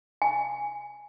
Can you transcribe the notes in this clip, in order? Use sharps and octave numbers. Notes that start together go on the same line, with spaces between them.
G#5